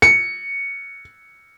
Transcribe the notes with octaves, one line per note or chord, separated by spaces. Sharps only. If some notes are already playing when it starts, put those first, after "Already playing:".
C#7